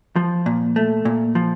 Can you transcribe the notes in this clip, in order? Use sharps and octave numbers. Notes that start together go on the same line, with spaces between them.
F3
A#2
A3
A#2
F3